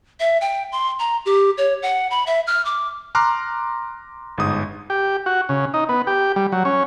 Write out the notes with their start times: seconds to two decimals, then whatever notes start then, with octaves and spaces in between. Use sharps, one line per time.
0.20 E5
0.41 G5
0.72 C6
0.99 A#5
1.26 G4
1.58 C#5
1.83 F#5
2.11 B5
2.27 E5
2.47 F6
2.65 D6
3.15 A#5 C6 D6 F6 F#6
4.38 G1 G#2 D#6
4.90 G4
5.26 F#4
5.49 C#3
5.74 D#4
5.89 B3
6.07 G4
6.36 G3
6.52 F#3
6.65 C#4